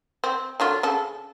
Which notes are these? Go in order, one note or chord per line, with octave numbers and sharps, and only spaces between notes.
C4
D3 F#3 F4
C#3 A4